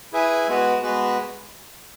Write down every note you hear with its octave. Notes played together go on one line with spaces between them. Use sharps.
E4 G#4 B4 E5 G#5
G#3 B3 F#4 B4
G#3 B3 F#4 B4